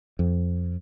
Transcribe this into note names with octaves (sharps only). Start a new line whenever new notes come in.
F2